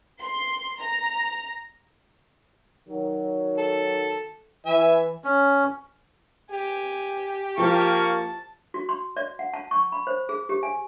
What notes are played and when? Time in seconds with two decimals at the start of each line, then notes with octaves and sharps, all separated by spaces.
0.21 C6
0.79 A#5
2.88 D#3 F#3
3.58 A4
4.66 E3 E5 G#5
5.24 C#4
6.51 G4 G#5
7.58 F3 A#3 F5 A5 C#6
8.74 F#4
8.89 C6
9.17 D5
9.39 F#5
9.54 A5
9.71 C#6
9.92 B5
10.07 C5
10.29 G#4
10.49 G4
10.63 G#5